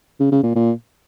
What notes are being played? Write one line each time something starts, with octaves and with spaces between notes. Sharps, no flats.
C#3
C#3
A#2
A#2